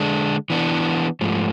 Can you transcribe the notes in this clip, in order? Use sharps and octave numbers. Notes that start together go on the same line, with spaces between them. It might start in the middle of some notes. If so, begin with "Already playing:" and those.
Already playing: D3 G#3 D4
E3 B3 D4
G#2 F3 A3